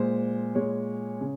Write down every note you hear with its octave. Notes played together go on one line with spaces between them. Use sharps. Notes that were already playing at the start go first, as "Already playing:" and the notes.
Already playing: A#2 G#3 C5
A#2 G#3 C#5
C#3